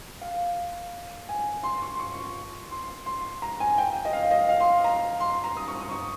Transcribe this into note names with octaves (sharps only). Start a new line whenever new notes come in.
F5
G#5
C6
C#6
C6
C#6
C6
C6
A#5
G#5
G5
D#5
F5
D#5
F5
C6
A#5
C6
A#5
D#6
C#6
D#6
C#6